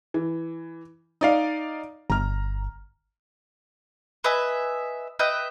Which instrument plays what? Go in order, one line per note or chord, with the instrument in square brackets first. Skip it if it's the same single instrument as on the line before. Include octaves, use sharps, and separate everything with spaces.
[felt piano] E3
D#4 D5 F5
[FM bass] G1 [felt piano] A#5 F6
[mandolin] B4 D#5 E5 G#5
B4 D#5 E5 G5